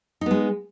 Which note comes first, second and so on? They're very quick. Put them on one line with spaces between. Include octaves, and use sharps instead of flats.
D#4 B3 G#3